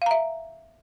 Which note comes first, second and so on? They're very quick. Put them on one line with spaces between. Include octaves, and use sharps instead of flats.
F5 A#5 E5